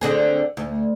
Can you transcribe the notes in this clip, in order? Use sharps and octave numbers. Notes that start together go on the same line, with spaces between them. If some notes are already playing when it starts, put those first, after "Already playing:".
D3 C4 G#4
D2